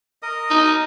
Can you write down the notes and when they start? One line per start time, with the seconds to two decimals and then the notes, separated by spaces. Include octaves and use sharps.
0.22 A#4 D#5 D#6
0.50 D#4